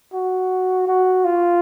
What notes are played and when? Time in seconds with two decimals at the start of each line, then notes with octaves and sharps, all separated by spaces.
0.14 F#4
0.88 F#4
1.25 F4